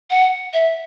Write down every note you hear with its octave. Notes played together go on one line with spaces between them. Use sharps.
F#5
E5